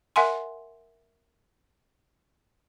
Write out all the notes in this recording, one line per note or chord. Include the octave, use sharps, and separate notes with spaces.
A#4 E5 F#5 G#5 C6